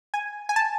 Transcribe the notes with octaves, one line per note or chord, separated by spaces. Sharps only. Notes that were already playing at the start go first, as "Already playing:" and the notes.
G#5
G#5
A5